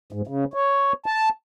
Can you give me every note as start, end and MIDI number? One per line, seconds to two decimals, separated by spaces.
0.12 0.21 44
0.27 0.45 49
0.54 0.93 73
1.06 1.29 81